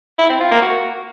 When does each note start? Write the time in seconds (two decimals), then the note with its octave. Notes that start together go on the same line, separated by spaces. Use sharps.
0.18 E4
0.29 C4
0.40 F4
0.51 A#3
0.62 F#4